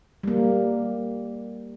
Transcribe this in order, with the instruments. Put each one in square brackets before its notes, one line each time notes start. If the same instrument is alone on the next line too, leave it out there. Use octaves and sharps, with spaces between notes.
[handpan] G3 A#3